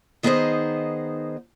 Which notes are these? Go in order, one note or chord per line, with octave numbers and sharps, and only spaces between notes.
D#3 B3 D#4 G#4 C5 D#5